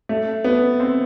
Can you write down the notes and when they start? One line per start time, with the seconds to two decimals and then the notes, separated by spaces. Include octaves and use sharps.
0.09 A3
0.44 B3
0.80 C4